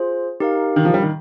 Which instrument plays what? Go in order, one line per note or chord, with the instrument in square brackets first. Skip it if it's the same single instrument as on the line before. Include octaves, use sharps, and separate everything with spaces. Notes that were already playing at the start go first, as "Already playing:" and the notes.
Already playing: [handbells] F4 G#4 C5
D#4 G4 A#4 F5
[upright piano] D#3
F3
G3
D#3